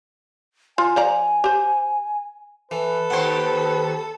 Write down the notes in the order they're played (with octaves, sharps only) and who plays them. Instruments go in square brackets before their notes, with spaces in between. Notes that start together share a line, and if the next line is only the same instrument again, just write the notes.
[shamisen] F4 [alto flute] G#5
[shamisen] F3 D5 A#5
G4 C5
[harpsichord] E3 [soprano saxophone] A4 [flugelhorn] B4
[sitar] D#2 G4 C5 [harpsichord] F#5